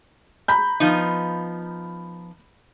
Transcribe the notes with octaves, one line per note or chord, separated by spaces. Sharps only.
A#5 B5 G6
F3 B3 D#4